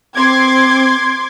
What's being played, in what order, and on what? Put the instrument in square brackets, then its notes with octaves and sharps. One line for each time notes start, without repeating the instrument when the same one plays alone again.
[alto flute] C4 [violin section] C6 D6 G#6